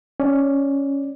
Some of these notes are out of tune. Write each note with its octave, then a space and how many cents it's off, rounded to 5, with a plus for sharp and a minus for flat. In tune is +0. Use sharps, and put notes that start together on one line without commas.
C#4 +0 D5 +0